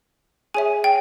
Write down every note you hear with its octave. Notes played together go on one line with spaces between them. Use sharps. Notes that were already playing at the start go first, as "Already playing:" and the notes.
G#4 C#5 E5 G#5
G5